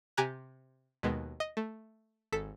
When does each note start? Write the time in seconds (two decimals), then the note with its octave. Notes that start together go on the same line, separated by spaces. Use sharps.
0.17 C3 G4 G#5 A#5 F#6
1.03 D#2 B2 G#3 B3
1.40 D#5
1.57 A3
2.32 G#1 A4 B6